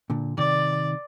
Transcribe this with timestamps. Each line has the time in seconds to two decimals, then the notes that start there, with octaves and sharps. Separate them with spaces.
0.10 A#2 D3
0.38 C3 D#3 D5